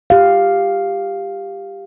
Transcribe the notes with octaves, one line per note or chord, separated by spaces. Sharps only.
G4 F5